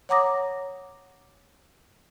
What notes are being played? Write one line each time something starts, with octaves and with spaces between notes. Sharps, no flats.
C#5 F#5 A#5 D6 D#6 A#6